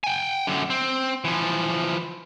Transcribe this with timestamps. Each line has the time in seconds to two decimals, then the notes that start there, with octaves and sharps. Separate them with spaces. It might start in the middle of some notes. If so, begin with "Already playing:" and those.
0.04 G5 G#5
0.47 F#2 D3
0.70 C4
1.24 E3 F3